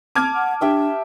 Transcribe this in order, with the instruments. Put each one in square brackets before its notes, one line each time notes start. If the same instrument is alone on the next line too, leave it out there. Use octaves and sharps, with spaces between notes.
[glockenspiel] A5 [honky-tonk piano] D6 F6 G#6
[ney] F#5
[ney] D4 [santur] G4 E5 G5